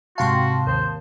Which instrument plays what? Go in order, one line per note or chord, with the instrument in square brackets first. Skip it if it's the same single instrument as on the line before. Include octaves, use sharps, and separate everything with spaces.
[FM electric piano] G#2 C3 A5 [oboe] F#4 [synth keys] F5 G5 C6
[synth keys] D#2 [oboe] C5